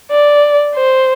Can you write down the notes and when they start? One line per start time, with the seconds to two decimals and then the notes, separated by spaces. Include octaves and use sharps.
0.11 D5
0.75 C5